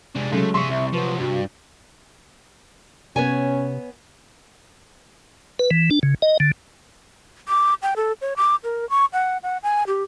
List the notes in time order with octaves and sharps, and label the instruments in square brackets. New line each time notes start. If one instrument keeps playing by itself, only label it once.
[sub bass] C3 [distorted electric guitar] G#3 D4
[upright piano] C#3 G#3 [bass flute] F#3 [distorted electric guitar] A3
[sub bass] C3 [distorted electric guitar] G#4 E5 [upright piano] C6 C#6
[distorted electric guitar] C2 [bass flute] E5
[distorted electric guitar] F3 F#3 [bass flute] B4
[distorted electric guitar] G2 [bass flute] F#4
[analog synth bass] C3 [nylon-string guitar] B3 C#5 G#5 [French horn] C#4
[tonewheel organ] B4
E3
D4
C#3
D#5
D3
[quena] D6
G5
A4
C#5
D6
A#4
C#6
F#5
F#5
G#5
G4